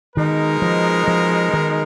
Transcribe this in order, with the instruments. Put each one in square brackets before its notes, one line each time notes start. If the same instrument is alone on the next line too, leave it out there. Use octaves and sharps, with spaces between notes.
[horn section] B2 G#3 D#4 A#4 [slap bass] D#3
[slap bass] F3
F3
D#3